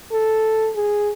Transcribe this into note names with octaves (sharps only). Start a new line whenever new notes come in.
A4
G#4